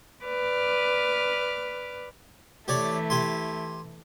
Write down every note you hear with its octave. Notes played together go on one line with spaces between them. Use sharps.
B4 D5 D6 F6
E3 A3 E4 G4 C#5 D5
G4 G#5 C6